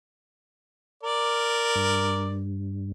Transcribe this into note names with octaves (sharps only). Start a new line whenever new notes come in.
A#4 D5
G2